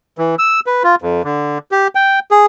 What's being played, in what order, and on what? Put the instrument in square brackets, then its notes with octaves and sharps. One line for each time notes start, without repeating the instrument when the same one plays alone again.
[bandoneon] E3
E6
B4
F4
F2
D3
G4
G5
G#4